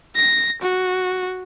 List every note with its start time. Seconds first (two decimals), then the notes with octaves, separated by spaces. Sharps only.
0.16 A#6
0.61 F#4